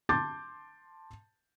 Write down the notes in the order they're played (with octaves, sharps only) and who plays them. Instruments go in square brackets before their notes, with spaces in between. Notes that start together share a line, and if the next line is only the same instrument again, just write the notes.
[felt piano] A5 C6 D6 G6 A6